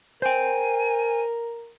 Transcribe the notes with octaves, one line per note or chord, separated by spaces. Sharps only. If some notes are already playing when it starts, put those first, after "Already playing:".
A#4 C5 G5 G#5